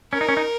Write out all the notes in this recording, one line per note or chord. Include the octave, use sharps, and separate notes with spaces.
C#4 A#4
D#4
C#4
D#4